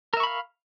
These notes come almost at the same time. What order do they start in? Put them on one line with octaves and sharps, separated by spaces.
A#4 E5 C#6 B5 F5